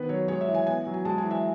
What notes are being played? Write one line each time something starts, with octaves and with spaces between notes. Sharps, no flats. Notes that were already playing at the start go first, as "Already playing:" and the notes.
Already playing: D#3 B3 B4
F#3 C#5
G#3 C#5
E5
E3
G#5
B3 G#5
F#3
G#5
G#3 A5
G#5
E3
E5